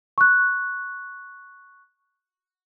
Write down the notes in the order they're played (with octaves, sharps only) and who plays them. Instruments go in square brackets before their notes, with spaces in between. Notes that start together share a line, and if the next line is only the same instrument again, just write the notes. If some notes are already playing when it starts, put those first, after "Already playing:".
[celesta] C#6 F#6